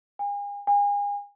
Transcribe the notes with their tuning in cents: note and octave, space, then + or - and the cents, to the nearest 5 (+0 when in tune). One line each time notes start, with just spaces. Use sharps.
G#5 -40
G#5 -35